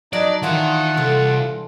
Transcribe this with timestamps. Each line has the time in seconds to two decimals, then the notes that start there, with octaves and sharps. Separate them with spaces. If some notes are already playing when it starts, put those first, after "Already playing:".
0.13 F#3 D4 D#4 D5 D#5
0.43 D#3 E3 C4 D4 F4 F#5
0.97 C2 A4